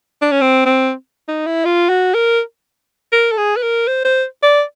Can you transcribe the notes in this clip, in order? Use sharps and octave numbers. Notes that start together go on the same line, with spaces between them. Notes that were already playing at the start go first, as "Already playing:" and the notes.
D4
C#4
C4
C4
D#4
E4
F4
F#4
A#4
A#4
A4
G#4
B4
A#4
C5
C5
D5